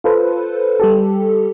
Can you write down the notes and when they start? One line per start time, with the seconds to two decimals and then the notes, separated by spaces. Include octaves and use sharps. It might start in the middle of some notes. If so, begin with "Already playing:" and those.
0.04 F4 A4 B4 C5
0.80 G3 G4 A4